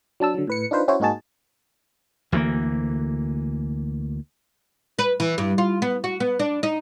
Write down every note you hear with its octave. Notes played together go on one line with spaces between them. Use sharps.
F#3 D4 A5 E6
D3 F#3
A2 B4 C#7
D4 D#4 F4 B4 C5
C#4 E4 F#4 C5 C#5
G#2 A#3 D#4 F#4 G#4 A5
D2 E3 A3 A#3
B4
E3
G2
F4
B3
F#4
B3
D4
D#4